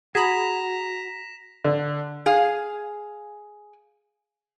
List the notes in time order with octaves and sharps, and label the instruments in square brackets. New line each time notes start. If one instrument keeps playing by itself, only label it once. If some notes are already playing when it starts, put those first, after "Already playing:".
[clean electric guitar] F#4 [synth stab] G#4 B5 [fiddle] A#5 [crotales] A#6 B6 E7
[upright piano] D3
[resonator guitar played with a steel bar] G#4 F5